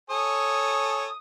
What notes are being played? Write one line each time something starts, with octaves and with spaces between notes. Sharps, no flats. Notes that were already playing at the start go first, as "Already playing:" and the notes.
A4 C#5 G#5 D#6